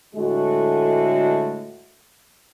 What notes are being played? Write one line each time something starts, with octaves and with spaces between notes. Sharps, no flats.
A2 D3 G#3 A3 F#4